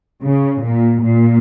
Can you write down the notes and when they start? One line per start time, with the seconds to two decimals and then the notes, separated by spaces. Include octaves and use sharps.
0.23 C#3
0.64 A#2
1.04 A#2